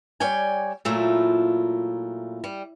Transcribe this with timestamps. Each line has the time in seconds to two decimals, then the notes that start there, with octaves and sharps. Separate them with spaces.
0.20 G3 C#5 D5 G5 G#5
0.85 A#2 F#3 A3 E4 F4
2.44 G3